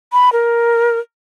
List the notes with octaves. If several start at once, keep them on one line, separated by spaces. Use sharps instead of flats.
B5
A#4